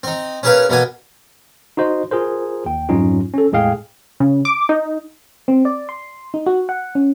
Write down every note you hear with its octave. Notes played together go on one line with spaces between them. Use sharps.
C4 D#4
C#4 E4 G#4 A#4 B4 F5
B2 A#3 B3 G#5
D#4 F#4 C5 D#5
F4 G#4 A#4 C5
D#2 G5
F2 G#2 F#3 C#4 D#4 F4
C#4 A4
E2 A2 G#3 G#4 F5 G5
C#3
D6
D#4
C4
D5
C6
D#4
F#4
F#5
C#4